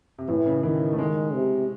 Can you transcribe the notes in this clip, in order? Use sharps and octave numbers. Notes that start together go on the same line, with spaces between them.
C3
A2 E3
C#3
D#3 E3
A3
D#3 G#3
C3